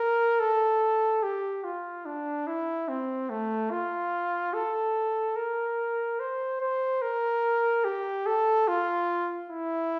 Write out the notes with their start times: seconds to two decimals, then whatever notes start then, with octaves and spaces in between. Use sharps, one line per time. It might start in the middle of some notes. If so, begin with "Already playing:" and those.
Already playing: A#4
0.40 A4
1.23 G4
1.64 F4
2.06 D4
2.47 E4
2.89 C4
3.30 A3
3.71 F4
4.54 A4
5.36 A#4
6.20 C5
6.61 C5
7.02 A#4
7.84 G4
8.26 A4
8.68 F4
9.50 E4